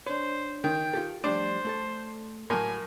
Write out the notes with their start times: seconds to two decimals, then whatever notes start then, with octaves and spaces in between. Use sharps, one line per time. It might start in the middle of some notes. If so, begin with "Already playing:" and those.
0.07 D4 C5 C#5
0.64 D#3 G5
0.94 F4 G4 A4
1.24 F3 G3 A3 D4 C5 D6
1.65 A3 A4 A5
2.50 A2 F#3 A#3 G#5 C6